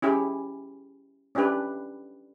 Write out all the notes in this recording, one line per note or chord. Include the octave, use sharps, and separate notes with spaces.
C#4 E4 G4 G#4
C#4 D4 E4 G4 B4